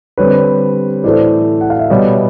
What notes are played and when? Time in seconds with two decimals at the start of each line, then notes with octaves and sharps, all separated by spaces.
0.18 D3 G3 C4 B4 C#5
1.03 A2 E3 A3 C5 D5
1.61 F#5
1.70 F5
1.79 E5
1.89 B2 G3 B3 C#5 D#5